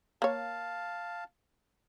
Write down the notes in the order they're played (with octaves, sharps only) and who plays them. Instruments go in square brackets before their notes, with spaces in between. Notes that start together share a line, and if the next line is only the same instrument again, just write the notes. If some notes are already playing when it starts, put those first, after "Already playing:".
[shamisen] A#3 C#5 [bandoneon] F5 A5